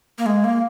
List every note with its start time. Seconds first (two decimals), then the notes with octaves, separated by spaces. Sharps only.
0.18 A#3
0.26 G#3
0.44 A#3